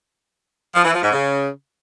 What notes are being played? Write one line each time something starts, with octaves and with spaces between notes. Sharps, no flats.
F3
E3
F3
G#2
C#3